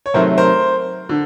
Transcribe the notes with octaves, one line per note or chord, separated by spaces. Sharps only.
C#5
C3 D#3 F#3 A3 A#4 C5
A#4 C5
D3